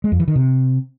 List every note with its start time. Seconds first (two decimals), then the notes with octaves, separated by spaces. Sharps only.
0.04 G#3
0.12 F2
0.20 E3
0.28 D#3
0.36 C3